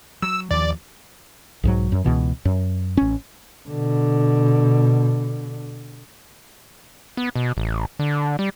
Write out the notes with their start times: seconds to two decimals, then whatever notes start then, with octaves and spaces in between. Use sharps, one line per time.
0.22 F#3 E6
0.51 D#2 F3 D5
1.64 B1 G#2 F#3
1.92 F#2
2.04 C#2 B2 E3
2.45 F#2
2.97 A1 C#4
3.69 B2 D3
7.17 B3
7.35 B2
7.57 A1
7.99 D3
8.39 G3